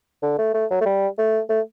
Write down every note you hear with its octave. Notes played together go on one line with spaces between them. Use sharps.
D3
A3
A3
F#3
A3
G3
A3
A3